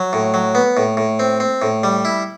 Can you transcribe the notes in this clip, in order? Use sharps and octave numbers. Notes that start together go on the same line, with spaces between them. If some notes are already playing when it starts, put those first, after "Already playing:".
Already playing: F#3
A2
F#3
B3
A2
A2
C4
C4
A2
G3
E4